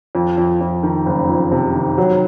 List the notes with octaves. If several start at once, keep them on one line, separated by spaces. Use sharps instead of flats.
F2
F2
F2
D#3
F#1
F2
C3
D#3
F#3